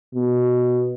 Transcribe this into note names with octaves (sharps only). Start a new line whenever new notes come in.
B2